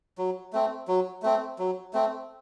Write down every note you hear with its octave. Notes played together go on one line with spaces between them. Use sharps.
F#3
A3 C4
F#3
A3 C4
F#3
A3 C4